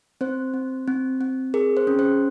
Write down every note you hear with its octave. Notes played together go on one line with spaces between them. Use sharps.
C4 C5
C4
C4
C4
G#4 A#4
C5
C#4
C5